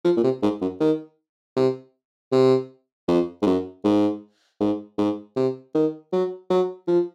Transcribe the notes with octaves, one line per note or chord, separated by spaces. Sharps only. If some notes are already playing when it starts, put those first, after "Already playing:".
F3
A#2
C3
G#2
F#2
D#3
C3
C3
F2
G#2
F#2
G#2
G#2
G#2
C3
D#3
F#3
F#3
F3